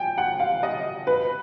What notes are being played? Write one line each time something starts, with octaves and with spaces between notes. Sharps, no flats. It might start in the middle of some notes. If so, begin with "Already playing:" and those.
Already playing: G5 G#5
F#5
F5
D#5
B4